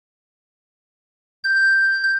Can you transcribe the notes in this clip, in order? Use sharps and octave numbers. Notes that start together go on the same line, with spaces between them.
G6